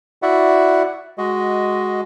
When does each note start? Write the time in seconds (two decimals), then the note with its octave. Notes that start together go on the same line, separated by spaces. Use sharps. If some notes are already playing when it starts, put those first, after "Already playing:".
0.22 E4 F#4 D5 E5 F#5
1.18 G#3 F#4 D#5